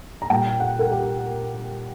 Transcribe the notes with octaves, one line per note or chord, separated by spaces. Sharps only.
A#5
A#2 G3 G5
F#5
A#4
G4